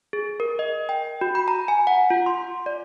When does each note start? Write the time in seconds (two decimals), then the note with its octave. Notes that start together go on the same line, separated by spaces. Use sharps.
0.13 G#4
0.40 A#4
0.59 D#5
0.89 G5
1.21 F#4
1.35 B5
1.48 A#5
1.68 G#5
1.87 F#5
2.10 F4
2.26 C6
2.66 D5